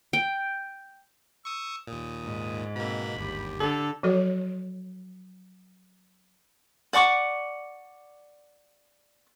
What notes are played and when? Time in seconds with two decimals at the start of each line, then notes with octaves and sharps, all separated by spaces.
0.13 G5
1.45 C#6 D#6 E6
1.88 D#2 A#2 D#6
2.24 G#2
2.76 B2 A#3 C4 B5
3.16 G1 D#2 G4
3.60 D3 A4
4.03 F3 F#3 F#4 A4 C#5
6.93 D5 F#5 C#6 D6